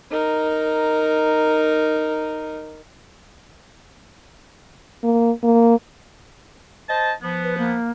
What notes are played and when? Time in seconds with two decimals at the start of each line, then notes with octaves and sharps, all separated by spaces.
0.10 D#4 A#4
5.04 A#3
5.43 A#3
6.88 C5 D#5 A5
7.22 F3 B3
7.43 B4
7.58 A#3